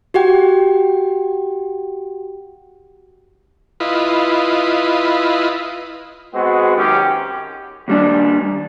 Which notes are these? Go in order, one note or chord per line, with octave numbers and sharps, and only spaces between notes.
F#4 G4 F#5 G5
E4 F4 B4 D#5
G#3 B3 C4 F#4 G#4
F#2 D#3 C#4 G4
D#2 G3 D4